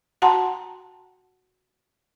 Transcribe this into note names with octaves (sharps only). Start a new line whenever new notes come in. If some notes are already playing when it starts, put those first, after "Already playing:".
F#4 F#5 G5 A5 A#5 C6